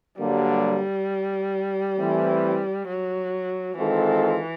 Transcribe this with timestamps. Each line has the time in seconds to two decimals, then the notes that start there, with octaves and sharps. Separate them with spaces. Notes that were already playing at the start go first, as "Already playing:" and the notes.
0.19 G2 D3 F#3 G3 A#3
1.98 E3 A3 C4
2.88 F#3
3.78 D#3 E3 G#3 C4 F4 A4